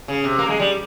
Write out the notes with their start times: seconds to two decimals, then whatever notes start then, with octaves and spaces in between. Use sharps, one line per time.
0.08 C#3
0.24 C3
0.38 A#3
0.49 G#3
0.60 G3